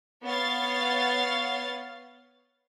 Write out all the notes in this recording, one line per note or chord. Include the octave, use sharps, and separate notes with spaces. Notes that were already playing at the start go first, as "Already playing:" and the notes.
B3 C#5 F5 A6